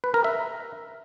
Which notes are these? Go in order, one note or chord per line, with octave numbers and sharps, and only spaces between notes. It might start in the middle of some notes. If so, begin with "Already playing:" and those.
B4
A#4
E5